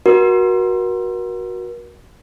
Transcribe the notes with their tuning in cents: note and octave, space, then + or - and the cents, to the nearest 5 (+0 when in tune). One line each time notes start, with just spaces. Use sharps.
F#4 +0 A#4 +35